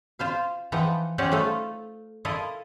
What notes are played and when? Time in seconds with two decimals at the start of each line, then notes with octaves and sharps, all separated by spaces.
0.19 F4 C5 F5
0.72 E3 F3 D#4 F#5 G5
1.18 C4 C#4 G4 C5 D5 F#5
1.32 A3 D#4 F4 A4
2.25 E4 F4 A4 A#4 D#5